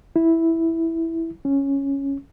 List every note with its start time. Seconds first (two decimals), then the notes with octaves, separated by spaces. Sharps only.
0.16 E4
1.45 C#4